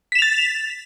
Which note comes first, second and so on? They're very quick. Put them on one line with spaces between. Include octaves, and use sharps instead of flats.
B6 E7 F7 A6